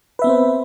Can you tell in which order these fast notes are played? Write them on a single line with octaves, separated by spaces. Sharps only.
B4 E5 B3 C4 C5